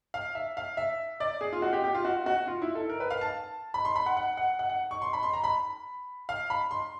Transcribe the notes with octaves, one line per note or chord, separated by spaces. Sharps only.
F5
E5
F5
E5
D5
G#4
F4
F#4
G4
G4
F4
F#4
F#4
F4
E4
A4
A#4
B4
F5
A5
B5
C6
B5
F#5
F#5
F#5
F#5
F#5
C#6
C6
B5
C6
A#5
B5
F5
B5
C6